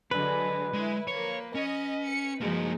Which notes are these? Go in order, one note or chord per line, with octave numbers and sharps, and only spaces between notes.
D3 F#3 G#3 B4
G#3 E4
F3 A#3 C#5
C#4 D#5
C#7
F3 G#3 A#3 D#4 F#4